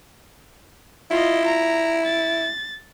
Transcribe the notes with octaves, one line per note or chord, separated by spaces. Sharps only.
E4 F4 D#5
A#5
A6